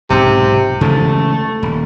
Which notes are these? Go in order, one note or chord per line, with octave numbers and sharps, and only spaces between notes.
B1 G#2 C3
C#3 E3 G#3 A3
D#1